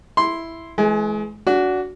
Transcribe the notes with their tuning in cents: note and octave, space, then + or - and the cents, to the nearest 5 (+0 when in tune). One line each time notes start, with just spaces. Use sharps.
E4 +0 C6 +0
E3 +5 G#3 +35 G#5 +0
D4 -30 F#4 +0